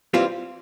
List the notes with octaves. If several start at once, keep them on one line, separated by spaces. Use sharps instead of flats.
E3 G3 C4 F4